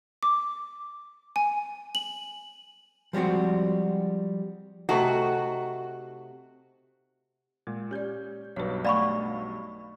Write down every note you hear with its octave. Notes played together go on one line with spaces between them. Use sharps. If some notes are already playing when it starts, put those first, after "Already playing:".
D6
G#5
F#7
F3 G3 G#3 C4 F#4
C3 A3 D#4 F#4
A#2 G#3
C#4 G4 D5 G6 G#6
B1 G2 F#3 B4 C#5
A3 D5 F5 F#5 B5 C#6